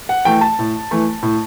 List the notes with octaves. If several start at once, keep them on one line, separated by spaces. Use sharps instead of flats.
F#5
E3 A3 G5
A5
A2
E3 A3
A2